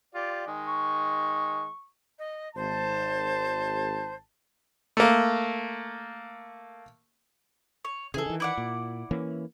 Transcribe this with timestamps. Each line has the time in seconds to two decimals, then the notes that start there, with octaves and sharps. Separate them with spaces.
0.15 F4 G4 D5
0.47 D#3 G#3
0.68 C#6
2.19 D#5
2.55 G#1 C5 A5
4.97 A3 A#3
7.84 C#5
8.14 C#3 E3 G#4 A4
8.26 D#3 E3
8.40 E4 D5 F#5
8.58 A#2
9.11 E3 A#3 C#4